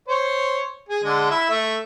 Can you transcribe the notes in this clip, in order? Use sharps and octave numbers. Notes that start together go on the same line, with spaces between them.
C5 C#5
G#4
D3 G#3 D4
E4 E5 E6
A3 E5